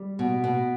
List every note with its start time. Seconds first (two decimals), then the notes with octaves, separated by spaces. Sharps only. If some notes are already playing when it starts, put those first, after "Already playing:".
Already playing: G3
0.19 B2
0.44 B2